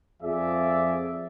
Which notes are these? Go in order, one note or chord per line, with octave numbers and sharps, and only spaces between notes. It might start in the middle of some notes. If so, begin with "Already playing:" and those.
F2 F3 G#4 D5 E5